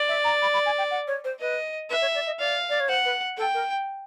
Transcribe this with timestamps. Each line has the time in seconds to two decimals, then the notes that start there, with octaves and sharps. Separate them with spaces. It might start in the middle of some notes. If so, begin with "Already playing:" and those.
Already playing: D5
0.09 E5
0.24 A#5
0.42 B5
0.54 B5
0.66 G#5
0.78 G5
0.91 F#5
1.08 C#5
1.24 C5
1.40 B4 D#5
1.90 B4 E5
2.01 C#5
2.15 D5
2.26 D#5
2.39 D5 F5
2.70 D5
2.80 C#5
2.89 C5 F#5
3.05 B4
3.38 A4 G5
3.54 A#4